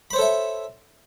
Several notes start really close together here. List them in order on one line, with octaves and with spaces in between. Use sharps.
B5 C5 C#5 A4 E5